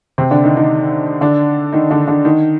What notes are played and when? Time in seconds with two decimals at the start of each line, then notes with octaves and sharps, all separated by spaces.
0.18 C3 C4
0.31 D3 D4
0.44 D#3 D#4
0.57 D#3 D#4
1.21 D3 D4
1.73 D#3 D#4
1.90 D3 D4
2.07 D3 D4
2.25 D#3 D#4